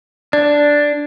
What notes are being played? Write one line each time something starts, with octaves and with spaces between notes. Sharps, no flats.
D4 D5